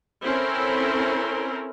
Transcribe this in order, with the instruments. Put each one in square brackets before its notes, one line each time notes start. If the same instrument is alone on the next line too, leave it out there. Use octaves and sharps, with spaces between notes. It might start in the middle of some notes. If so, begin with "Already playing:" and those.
[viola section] C4 C#4 E4 A4 A#4